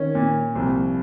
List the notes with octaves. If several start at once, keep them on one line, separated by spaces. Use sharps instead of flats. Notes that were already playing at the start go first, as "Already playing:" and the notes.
Already playing: D#3 C#4
A#2
C2 F3